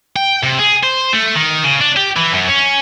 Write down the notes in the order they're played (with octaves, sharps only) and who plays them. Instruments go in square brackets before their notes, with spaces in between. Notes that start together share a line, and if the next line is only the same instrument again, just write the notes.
[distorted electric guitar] G5
C3
G#4
C5
A3
D#3
C#3
D4
G4
E3
F#2
C#4